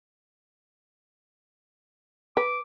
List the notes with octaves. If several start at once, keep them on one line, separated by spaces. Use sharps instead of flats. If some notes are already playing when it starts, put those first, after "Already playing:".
B4 D6